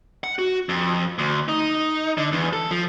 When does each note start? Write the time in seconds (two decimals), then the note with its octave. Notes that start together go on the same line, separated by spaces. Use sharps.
0.24 F#5
0.39 F#4
0.69 F2
1.19 D2
1.48 D#4
2.18 D3
2.33 E2
2.53 A4
2.71 F3